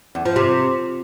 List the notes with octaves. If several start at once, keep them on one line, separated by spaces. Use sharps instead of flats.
E2
F3
C3